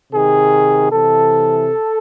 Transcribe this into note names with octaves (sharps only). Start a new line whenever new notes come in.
C3 D#3 G#4
C3 E3 A4